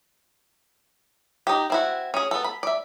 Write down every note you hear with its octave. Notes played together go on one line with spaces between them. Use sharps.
D#4 G4
C4 E4 F#4
C#4 G#4
B3 A4
B5
D5 E5